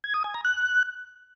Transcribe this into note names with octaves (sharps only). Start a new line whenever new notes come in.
G#6
D#6
G#5
A#5
F#6